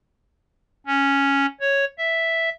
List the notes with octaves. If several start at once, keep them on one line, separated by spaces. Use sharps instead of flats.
C#4
C#5
E5